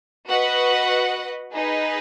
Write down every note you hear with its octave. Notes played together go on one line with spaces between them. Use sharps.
F#4 B4 D#5 F#5
D#4 G#4 B4 D#5